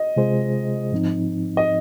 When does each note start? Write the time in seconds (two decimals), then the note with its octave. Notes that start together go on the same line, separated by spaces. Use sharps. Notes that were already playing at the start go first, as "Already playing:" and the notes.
Already playing: D#5
0.16 C3 G#3 F4 G#4 C5
0.92 G#2 F3 C4 D#4
1.57 D#5